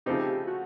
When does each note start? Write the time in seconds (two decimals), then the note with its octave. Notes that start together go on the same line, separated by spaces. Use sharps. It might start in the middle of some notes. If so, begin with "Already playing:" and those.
0.06 C#3 F3 A3 C4 D#4 G4
0.47 F#4